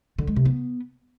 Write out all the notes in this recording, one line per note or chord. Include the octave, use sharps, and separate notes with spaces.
D3
G#3
C3
B3